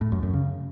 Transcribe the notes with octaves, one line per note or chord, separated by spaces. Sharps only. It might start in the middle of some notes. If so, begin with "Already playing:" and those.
A2
F#2
F#2
C#3